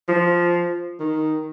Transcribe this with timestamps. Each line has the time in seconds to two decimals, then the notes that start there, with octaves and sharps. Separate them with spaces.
0.08 F3
1.00 D#3